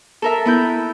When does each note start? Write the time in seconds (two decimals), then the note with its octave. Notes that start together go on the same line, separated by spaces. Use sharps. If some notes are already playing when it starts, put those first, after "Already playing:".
0.22 A4 A#4 E5
0.45 B3 E4 G6